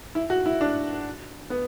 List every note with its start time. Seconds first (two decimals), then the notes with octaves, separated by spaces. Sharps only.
0.15 E4
0.30 F#4
0.46 E4
0.61 D4
1.50 B3